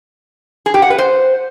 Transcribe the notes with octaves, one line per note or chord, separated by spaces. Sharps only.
G#4
G4
F#5
B4
C5